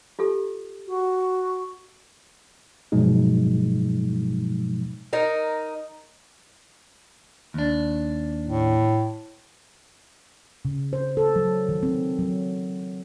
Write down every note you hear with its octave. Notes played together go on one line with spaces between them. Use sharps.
F4 G4 A4
F#4
G2 B2 F3 F#3 G#3 D#4
D#4 A#4
D#2 D4
A2
C#3
C5
A4
F#3
D#3
C4
F#3